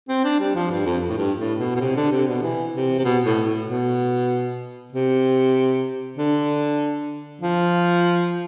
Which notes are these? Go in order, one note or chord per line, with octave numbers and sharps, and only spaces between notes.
C4
D4
G3
F3
G2
F2
A2
G2
A2
B2
B2
C3
D3
C3
B2
E3
C3
C3
B2
A2
A2
B2
C3
D3
F3